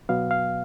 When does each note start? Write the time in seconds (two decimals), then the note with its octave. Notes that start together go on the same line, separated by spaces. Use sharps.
0.09 B2 F#3 B3 F5
0.31 F5